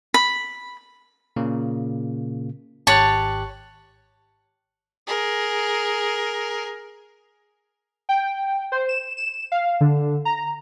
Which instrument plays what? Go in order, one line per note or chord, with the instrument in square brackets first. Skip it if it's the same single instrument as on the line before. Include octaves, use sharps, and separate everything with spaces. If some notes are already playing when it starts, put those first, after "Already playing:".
[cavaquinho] B5
[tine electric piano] A#2 C#3 A#3
[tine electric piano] G#1 G4 F#6 [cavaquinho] C#5 A5
[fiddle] G#4 A#4
[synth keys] G5
C5
E7
E7
F5
D3
A#5